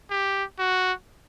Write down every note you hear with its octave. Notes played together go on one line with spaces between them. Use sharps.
G4
F#4